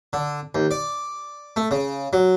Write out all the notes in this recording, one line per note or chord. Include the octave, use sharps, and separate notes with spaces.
D3
D#2
D5
A3
C#3
F#3